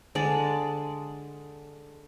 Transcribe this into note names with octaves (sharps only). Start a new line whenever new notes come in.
D3 G#3 D5 A5